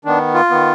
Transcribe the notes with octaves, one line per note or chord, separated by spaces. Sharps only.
D#3 B3 D4
F4
D#3 B3